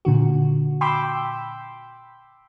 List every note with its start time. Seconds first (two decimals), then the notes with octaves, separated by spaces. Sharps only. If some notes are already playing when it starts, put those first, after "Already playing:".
0.05 A#2 D3 F#4
0.81 G5 B5 C6 D6 E6 G6